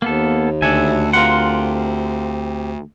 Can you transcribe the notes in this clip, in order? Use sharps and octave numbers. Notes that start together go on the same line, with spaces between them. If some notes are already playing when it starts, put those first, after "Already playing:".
D#2 A#3 B3 A4
D2 D4 A4 E5 G#5
C4 F4 G4 A#4 F#5 C6